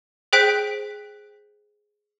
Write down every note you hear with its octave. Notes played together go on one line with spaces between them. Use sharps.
G#4 C5 G5 F#6 B6 D7